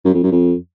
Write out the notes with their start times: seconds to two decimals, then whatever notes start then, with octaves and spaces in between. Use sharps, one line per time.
0.05 F#2
0.14 F2
0.23 F#2
0.32 F2